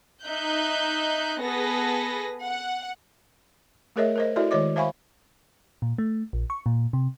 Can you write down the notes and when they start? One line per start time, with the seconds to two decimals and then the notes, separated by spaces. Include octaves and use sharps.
0.23 D#4 E5 F#6 G6
1.41 B3 G#4 A4 B4 A#6
2.44 F#5
3.96 A3 G#4 A#4 C#5 D#5 E5
4.16 A#4 C5 D#5
4.36 E4 F#4 A4 D5 E5
4.51 D#3 G#3 C#5 D#5 D6
4.76 C5 E5 F5 G#5 B5 C#6
5.82 A#2
5.98 A3
6.33 A#1
6.50 C#6
6.66 A#2
6.93 C3